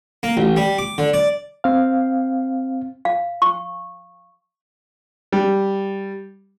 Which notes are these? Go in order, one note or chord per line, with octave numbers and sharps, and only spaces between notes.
A#3
A1
G3
D6
D3
D5
C4 F5
F5
C#6
G3